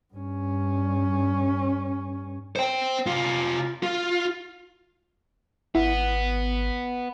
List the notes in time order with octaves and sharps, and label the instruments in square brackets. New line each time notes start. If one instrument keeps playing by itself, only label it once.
[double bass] G2 C#4
[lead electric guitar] C5 G5
C3 F4
F4
[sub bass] G#1 [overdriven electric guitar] B3 [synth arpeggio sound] E4